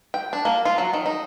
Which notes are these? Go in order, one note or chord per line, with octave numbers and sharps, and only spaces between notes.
G5
D4
A#3
F4
F#3
D#3
D#4